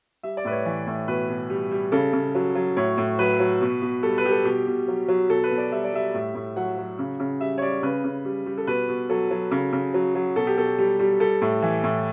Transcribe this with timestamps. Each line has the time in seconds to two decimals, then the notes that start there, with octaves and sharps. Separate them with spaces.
0.23 G3 E5
0.37 D5
0.45 A2 B4
0.52 C#5
0.66 E3
0.87 A2
1.08 B2 B4
1.29 B2
1.50 G3
1.71 G3
1.92 C#3 A4
2.13 C#3
2.35 F#3
2.55 F#3
2.77 A2 C#5
2.98 A2
3.19 F#3 B4
3.40 F#3
3.61 B2
3.82 B2
4.03 G3 A4
4.18 B4
4.24 G3 G4
4.31 A4
4.45 B2 G4
4.67 B2
4.88 F#3
5.08 F#3
5.29 B2 A4
5.44 B4
5.51 B2
5.58 D5
5.72 G3 E5
5.84 D5
5.93 G3 E5
6.14 A2
6.35 A2
6.56 F#3 F#5
6.77 F#3
6.99 C#3
7.20 C#3
7.41 G3 E5
7.58 C#5
7.62 G3 D5
7.83 C#3 B4
8.04 C#3
8.25 G3
8.46 G3
8.58 A4
8.67 B2 B4
8.89 B2
9.09 F#3 A4
9.31 F#3
9.52 C#3
9.73 C#3
9.94 F#3
10.15 F#3
10.36 B2 A4
10.47 G4
10.57 B2 A4
10.78 G3
10.99 G3
11.20 G3 A4
11.42 A2
11.62 E3
11.84 A2